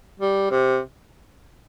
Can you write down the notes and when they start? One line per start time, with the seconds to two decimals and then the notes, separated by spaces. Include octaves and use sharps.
0.20 G3
0.51 C3